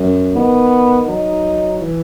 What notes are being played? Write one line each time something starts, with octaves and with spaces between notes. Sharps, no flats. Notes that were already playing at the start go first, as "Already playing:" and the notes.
Already playing: F#2
D#3 B3
F#3 D#4
E3